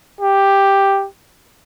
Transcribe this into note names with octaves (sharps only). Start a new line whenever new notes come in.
G4